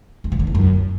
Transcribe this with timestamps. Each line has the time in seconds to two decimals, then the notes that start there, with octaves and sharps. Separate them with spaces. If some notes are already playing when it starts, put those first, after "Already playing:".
0.24 E2
0.32 C3
0.39 D3
0.47 E2
0.55 F#2